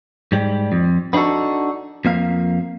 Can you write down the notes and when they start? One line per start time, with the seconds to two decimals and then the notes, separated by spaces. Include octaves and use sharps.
0.32 G#2 G3
0.72 F2
1.13 B3 D4 D#4 F#4 A4
2.05 F2 A#3 F5